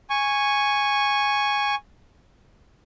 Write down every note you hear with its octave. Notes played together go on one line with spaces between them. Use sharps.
G#5 C#6